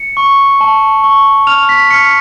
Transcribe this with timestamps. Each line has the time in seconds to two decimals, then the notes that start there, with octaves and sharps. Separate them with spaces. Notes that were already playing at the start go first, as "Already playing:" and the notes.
Already playing: C#7
0.17 C#6
0.61 A5
1.03 C#6
1.47 F6 F7
1.69 B6
1.90 F6 C#7